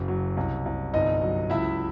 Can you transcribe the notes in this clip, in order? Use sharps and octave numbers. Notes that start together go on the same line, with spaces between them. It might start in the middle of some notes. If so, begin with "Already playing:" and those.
Already playing: F#1
F#3
C2
C2
G1 D#4 D#5
F#3
C#2 E4 E5